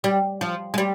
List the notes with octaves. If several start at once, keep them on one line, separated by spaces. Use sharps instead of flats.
G3
F3
G#3
G3